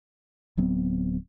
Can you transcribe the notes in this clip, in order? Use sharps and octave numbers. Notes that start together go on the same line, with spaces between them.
D1 F#3 B3 C4